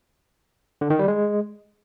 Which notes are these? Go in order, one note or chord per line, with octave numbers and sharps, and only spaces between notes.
D3
D#3
G3
G#3